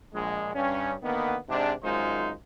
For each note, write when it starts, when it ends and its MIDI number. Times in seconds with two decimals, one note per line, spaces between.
0.13 0.51 34
0.13 0.51 56
0.55 0.94 43
0.55 0.94 61
1.02 1.35 50
1.02 1.35 51
1.02 1.35 58
1.02 1.35 59
1.49 1.73 44
1.49 1.73 48
1.49 1.73 56
1.49 1.73 62
1.83 2.32 32
1.83 2.32 42
1.83 2.32 56
1.83 2.32 63
1.83 2.32 65
1.83 2.32 72